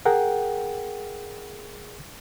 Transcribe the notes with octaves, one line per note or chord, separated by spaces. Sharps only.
G#4 A#4 F#5 G5